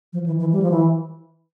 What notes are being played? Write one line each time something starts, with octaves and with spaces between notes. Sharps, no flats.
F3
E3
E3
G3
F3
E3